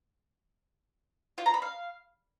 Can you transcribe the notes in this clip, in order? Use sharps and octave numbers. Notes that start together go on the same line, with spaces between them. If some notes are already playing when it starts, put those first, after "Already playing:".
F4
A#5
B5
F5